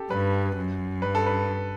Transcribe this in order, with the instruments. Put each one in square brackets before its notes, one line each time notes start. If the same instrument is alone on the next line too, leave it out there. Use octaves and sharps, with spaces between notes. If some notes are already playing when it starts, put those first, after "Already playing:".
Already playing: [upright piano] G4 A4
[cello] G2 [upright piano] B4
[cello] F#2
[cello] G2 [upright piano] B4
[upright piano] A4
B4